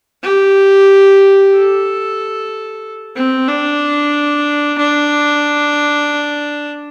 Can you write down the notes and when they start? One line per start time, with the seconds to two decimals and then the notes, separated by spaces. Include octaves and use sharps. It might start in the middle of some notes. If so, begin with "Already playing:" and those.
0.23 G4
1.54 A4
3.15 C4
3.48 D4
4.78 D4